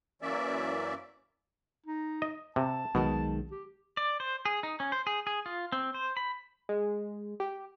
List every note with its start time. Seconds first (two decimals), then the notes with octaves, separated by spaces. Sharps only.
0.22 F#2 E3 A#3 C#4 D5 E5
1.86 D#4
2.22 D#5
2.56 C3 A5
2.95 B1 B2 D#3 G#3
3.51 G4
3.97 D5
4.20 C5
4.45 G#4
4.63 D#4
4.80 C#4
4.92 C5
5.07 G#4
5.27 G#4
5.46 F4
5.72 C4
5.94 C5
6.17 B5
6.69 G#3
7.40 G4